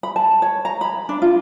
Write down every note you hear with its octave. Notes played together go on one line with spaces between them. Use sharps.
B5
A5
C#5
A#5
B5
D4
F4